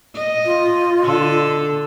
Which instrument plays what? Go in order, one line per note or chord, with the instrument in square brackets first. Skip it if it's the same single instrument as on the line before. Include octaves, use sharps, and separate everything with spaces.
[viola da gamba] D#5
[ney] F4
[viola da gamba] D3 A4